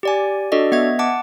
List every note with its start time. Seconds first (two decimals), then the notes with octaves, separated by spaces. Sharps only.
0.03 G4 D5 G#5
0.52 D4 F#4 A4 D5 D#5
0.72 B3 D#5 E5 G#6
0.99 F#5 A5 D6